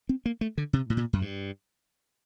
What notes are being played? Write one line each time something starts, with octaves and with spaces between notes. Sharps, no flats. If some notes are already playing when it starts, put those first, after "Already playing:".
C4
A#3
A3
D3
C3
A2
A#2
F#2
G2